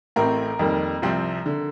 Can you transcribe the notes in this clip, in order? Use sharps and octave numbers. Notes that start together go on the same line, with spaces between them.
A1 A2 A3 C4 A#4
F2 D#3 G3 A#3
C2 C3 F3 C4
D3